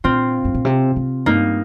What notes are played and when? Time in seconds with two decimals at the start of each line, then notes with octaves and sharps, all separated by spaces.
0.04 A#2 C4 F4
0.45 G2
0.54 A#2
0.65 C3
0.96 C3
1.26 G2 A#3 D#4